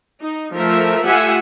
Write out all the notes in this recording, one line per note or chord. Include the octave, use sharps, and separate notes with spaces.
D#4
F3 A3 A#4 E5
A3 F4 G4 E5 F#5 G#5